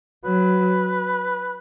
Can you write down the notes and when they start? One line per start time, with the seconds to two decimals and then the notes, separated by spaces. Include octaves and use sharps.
0.25 F#3 B4